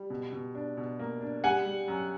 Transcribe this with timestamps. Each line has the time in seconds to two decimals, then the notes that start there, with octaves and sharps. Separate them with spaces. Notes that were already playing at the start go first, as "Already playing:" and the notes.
Already playing: G3
0.10 B2
0.33 B2
0.55 D4
0.77 B2
0.99 A#3
1.21 D4
1.44 G3 F#5 G#5
1.66 G3
1.88 F#2